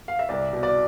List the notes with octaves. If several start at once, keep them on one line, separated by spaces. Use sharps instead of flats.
F5
E5
C2 D5
B2
D5